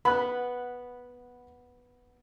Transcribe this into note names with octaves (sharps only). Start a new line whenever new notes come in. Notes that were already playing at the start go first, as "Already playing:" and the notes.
B3 B5 F#6